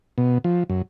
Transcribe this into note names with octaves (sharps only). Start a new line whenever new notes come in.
B2
F3
F#2